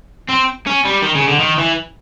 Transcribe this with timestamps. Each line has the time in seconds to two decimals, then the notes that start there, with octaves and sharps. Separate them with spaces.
0.29 C4
0.67 C#4
0.85 G3
1.02 D#3
1.15 C#3
1.28 D3
1.40 D#3
1.58 E3